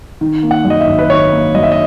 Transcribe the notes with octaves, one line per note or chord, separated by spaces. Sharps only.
D#3
A#3
F#5
F#2
D#5
E5
G#1
B4
D#3 C#5
A#3
F#2 D#5
E5
D#5